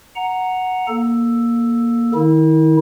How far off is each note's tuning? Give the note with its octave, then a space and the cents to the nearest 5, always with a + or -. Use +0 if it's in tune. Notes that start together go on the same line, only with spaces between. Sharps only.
F#5 +0 A#5 +0
A#3 +10 A4 +0
D#3 +0 E4 -40